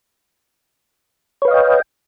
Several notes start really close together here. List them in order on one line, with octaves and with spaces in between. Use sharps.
C#5 B4 F5 D#5 G5